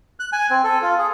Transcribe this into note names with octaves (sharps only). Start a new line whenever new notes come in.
F#6
G#5
C4
A4
F4
G#4